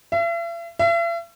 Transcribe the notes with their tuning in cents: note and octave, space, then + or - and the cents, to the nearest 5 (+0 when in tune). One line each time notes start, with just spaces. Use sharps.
E5 +45
E5 +45